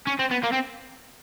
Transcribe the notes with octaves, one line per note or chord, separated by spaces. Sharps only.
C#4
C4
B3
A#3
C4